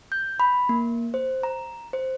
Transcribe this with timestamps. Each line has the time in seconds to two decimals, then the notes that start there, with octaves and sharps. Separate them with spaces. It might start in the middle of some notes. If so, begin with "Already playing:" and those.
0.12 G6
0.40 B5
0.69 A#3
1.14 C5
1.43 A#5
1.93 C5